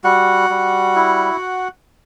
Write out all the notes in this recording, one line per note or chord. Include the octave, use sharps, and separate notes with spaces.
G3 F#4 F#5
G3
E4